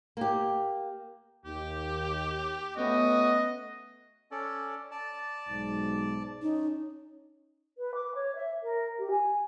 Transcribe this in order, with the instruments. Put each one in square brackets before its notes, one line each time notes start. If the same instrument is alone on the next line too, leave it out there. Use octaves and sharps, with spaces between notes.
[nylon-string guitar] A#3 G4
[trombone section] D#2 [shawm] G4
[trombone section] A3 B3 C#4 [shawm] F#4 [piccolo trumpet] D#5
[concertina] C#4 A4 D5
D5 A5
[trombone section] B1 G#2
[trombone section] C#4 [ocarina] D#4
[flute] B4
D6
C#5
E5
A#4
G4
G#5